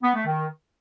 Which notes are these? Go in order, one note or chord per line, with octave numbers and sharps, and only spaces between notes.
B3
A3
D#3